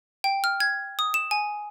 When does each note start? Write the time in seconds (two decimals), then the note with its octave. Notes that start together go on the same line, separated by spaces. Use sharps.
0.24 G5
0.44 F6
0.60 G#6
0.99 D#6
1.14 E7
1.31 G#5